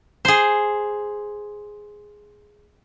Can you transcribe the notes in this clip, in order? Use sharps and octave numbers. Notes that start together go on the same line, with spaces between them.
G#4 C5